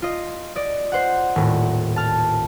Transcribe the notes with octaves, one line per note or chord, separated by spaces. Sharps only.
F4 D#5
D5 D#5
C5 F#5
D#1 A2
A5 F6